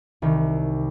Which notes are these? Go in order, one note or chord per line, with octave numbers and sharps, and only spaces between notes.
C2 D#3